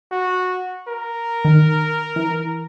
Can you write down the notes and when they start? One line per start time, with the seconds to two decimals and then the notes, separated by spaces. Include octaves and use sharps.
0.12 F#4
0.88 A#4
1.45 D#3
2.16 E3